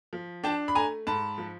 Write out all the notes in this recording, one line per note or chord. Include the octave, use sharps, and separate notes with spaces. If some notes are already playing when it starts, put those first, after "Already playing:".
F3
D4 G5 A5
B5
A3 G#5 A#5
G#2 A5 B5
F3